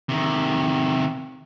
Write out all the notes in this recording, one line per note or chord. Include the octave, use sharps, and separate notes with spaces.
C3 D#3